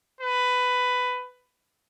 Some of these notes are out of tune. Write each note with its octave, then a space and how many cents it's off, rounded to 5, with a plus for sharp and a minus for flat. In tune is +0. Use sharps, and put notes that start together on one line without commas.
B4 +15